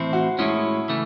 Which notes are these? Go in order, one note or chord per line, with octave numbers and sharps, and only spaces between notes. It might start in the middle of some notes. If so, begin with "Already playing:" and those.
Already playing: A2 E3 C4 E4 C5
F#4
A2 G#3 C#4 E4
C#3 E3 A3